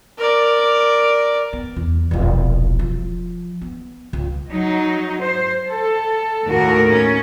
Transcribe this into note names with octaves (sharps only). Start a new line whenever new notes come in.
A#4 D5
B3
E2
E1 A#1
F3
B3
C#2
F#3 D#4
C5
A4
D#2 A2 F#4 A#4
C#4